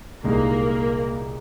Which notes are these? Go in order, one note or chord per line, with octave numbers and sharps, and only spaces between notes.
C2 A#2 G#3 A#3 D#4